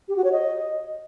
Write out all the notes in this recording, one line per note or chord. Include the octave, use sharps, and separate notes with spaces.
G4
F#4
C#5
D#5